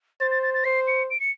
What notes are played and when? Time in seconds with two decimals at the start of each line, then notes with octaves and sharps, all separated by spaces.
0.20 C5 A6
0.31 A6
0.43 A6
0.54 A6
0.65 C5 C7
0.87 C#7
1.10 D7
1.20 C#7